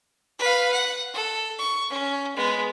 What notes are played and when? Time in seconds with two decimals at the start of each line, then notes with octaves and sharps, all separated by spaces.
0.39 B4 F5
0.72 F#5
1.14 A4
1.59 C#6
1.90 C#4
2.36 G#3 B3